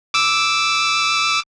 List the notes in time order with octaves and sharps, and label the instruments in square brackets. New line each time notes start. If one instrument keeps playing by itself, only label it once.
[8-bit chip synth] D6 E6